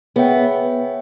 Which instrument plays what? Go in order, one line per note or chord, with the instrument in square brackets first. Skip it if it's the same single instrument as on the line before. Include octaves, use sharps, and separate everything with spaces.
[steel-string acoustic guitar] B3 [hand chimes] G#4 C#5 E5 G5